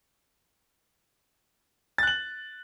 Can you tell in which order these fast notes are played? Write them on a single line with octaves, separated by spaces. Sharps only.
A6 F#6 F#7